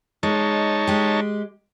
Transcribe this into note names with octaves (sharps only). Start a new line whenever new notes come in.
G#3 D#4 C#5 A5
G#3 G4